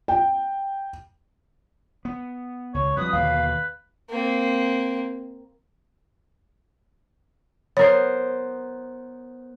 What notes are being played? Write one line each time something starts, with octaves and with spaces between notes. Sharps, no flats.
G5
B3
C#2 C#5
F2 G3 B4 D#6
D#2 B2 D3 F5
A#3 C4
B3 A#4 C5 C#5